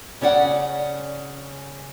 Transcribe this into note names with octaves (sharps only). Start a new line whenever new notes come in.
C#3 C#4 D5 F#5